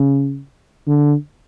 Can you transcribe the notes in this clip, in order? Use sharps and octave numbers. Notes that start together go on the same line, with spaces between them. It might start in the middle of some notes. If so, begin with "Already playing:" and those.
Already playing: C#3
D3